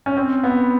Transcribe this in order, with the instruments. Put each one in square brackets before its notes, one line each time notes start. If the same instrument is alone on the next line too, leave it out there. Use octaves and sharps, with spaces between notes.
[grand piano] C#4
C4
B3